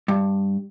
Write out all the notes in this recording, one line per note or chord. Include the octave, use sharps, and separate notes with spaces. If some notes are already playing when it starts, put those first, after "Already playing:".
G2